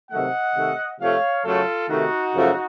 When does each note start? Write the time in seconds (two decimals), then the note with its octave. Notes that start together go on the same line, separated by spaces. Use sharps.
0.11 C3 D#3 F#3 A3 D#5 F#5
0.55 C3 D#3 A3
1.00 C3 F3 A3 C#5 F5
1.45 F#2 C#3 F#3 A3 F4 A4
1.89 C3 D#3 A3 D#4 F#4
2.35 F#2 C#3 F3 A3